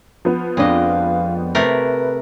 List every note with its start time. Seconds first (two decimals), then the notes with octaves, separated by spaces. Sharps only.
0.25 F3 B3
0.57 F2 G#3 D4 D#5 F5
1.55 C3 A3 A#4 B4